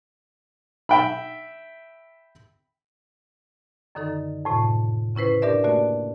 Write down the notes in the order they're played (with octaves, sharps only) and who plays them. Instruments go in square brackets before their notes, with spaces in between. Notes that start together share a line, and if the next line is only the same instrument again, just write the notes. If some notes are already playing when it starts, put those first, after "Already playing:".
[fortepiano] E5 G5 B5
[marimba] F#2 D3 D#3 D#4 A4
F2 A2 C3
C#3 C#4 E4 B4 C5
D4 G4 A#4 D5 E5
A3 A#3 F#4 D5